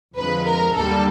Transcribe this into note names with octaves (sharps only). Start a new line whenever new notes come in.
F2 D3 F3 G#3 B4
A#4
D#2 D3 G3 A#3 A4